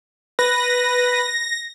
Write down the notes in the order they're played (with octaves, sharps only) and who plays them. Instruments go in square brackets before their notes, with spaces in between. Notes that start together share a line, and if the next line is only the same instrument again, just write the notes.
[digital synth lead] B4 [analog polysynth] A#6